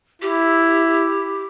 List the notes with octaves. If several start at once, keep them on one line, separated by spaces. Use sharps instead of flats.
E4 G4